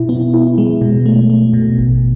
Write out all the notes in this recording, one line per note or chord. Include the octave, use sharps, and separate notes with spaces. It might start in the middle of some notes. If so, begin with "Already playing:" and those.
Already playing: B2 E4
B3
E4
G#3
B2
A3
A3
B2
A1